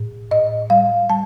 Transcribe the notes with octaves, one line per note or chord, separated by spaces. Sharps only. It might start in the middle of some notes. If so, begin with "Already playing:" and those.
Already playing: A2
A2 D#5
G3 F5
G3 A5